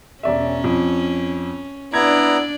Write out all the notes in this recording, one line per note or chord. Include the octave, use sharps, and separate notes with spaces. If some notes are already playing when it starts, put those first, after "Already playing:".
E1 C#4 D5 E5
F2
B3 D4 E4 D5 A#5 G#6